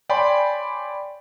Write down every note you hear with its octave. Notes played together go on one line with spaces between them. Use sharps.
C#5 D5 G5 G#5 B5 C6